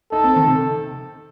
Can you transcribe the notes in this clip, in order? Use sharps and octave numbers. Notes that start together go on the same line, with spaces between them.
D#4 A4
C4
D#3
C3